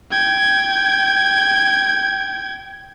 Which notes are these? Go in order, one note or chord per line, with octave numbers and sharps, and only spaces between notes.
G5 G#6